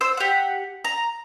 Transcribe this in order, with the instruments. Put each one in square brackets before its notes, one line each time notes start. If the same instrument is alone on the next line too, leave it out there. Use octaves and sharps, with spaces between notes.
[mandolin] C5 E6
G4 F#5
A#5